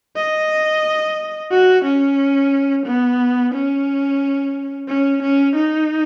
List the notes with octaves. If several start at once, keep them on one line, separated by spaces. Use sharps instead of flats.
D#5
F#4
C#4
B3
C#4
C#4
C#4
D#4